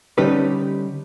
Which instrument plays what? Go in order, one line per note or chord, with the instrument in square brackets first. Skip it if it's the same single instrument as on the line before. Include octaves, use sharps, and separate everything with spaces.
[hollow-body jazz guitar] D3 G3 C#4 D#4 G4 B4